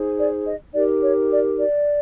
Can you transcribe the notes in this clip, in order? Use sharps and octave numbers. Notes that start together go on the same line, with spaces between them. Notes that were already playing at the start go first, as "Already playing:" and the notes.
Already playing: D#4 G#4 C5
D5
D#5
D#4 G4 A#4 D5
C#5
D5
D5